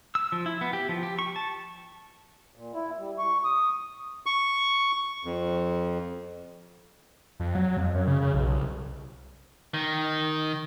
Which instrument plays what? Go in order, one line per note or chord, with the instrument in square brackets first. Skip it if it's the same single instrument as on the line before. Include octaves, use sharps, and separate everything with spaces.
[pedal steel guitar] E6
F3
E4
B3
G4
F3
G4
C#6
A5
[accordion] A#2
E4
G3
C#6
D#6
[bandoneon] C#6
F2
[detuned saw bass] F2
F#3
F2
F#2
C#3
C#3
B1
C2
[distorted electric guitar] D#3